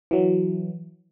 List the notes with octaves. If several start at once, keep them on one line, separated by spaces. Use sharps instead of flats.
E3 F#3